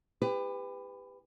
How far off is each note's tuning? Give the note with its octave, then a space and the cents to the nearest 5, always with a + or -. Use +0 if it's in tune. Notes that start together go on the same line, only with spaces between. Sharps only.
G4 +30 B4 +20 G#5 -20